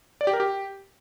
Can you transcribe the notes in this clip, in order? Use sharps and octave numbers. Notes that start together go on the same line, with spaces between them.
D5
G4
A#4
G4